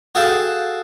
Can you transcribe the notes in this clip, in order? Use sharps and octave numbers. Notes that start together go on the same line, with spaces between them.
F#4 G#4 A4 F5 G5 A5